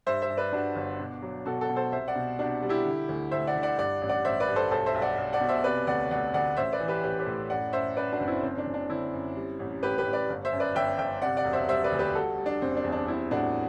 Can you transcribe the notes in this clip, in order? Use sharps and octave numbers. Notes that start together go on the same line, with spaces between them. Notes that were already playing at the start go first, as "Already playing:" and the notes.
G2 C5 E5
C5 E5
G2
B4 D5
G2 D4 F#4
G1
B2
F#3
B2 F#4 A4
F#4 A4
B2
A4 C5
C2 C5 E5
D5 F#5
B2
C2 D4 F#4
G3
E4 G4
D3
D2
D2 C5 E5
D5 F#5
D3
D5 F#5
G2 D5 F#5
A1
D5 F#5
A1 C5 E5
B4 D5
G2
A4 C5
B1 A4 C5
C5 E5
B1
D5 F#5
B1
D5 F#5
B2
C5 E5
C3 B4 D5
D2 D5 F#5
D2 D5 F#5
D2 D5 F#5
A1 C5 E5
B4 D5
E3
G4 B4
A1 G4 B4
G4 B4
A2
F#2 D5 F#5
F#2 C5 E5
F#2 B4 D5
D4 F#4
F#1
C4 E4
F#1 C4
D4
F#1
D4
D3 C4 E4
F#2
G3
A1
A1 G4 B4
G4 B4
A1
B4 D5
G1
C5 E5
F#2
B4 D5
G1 E5 G5
G1 E5 G5
C3 D5 F#5
D5 F#5
E1
C5 E5
G3 C5 E5
B4 D5
D2
G4 B4
G3 F#4 A4
G3
D4
F#1 C4
D4
E2
D4
G3 C4 E4
A2 D4 F#4